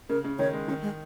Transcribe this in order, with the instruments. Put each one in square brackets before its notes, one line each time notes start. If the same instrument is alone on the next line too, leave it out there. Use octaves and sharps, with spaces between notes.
[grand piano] C#3 [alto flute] A#4
[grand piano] C#3
[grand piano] D#3 [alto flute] C#5
[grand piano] G#3
[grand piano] D#3 [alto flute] C#4
[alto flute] G#3